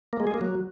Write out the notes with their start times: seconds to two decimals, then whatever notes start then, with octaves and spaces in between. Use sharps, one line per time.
0.13 A#3
0.20 G#3
0.27 G#4
0.34 A#3
0.41 F#3